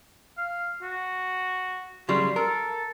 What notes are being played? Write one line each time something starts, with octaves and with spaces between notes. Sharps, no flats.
F5
F#4
C#3 F#3 G3 C6
A4 A#4